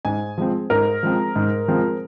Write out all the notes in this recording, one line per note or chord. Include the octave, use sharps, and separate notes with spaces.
G#2 G#5
F3 G#3 C4
G#2 A#4
F3 G#3 C4
G#2
F3 G#3 C4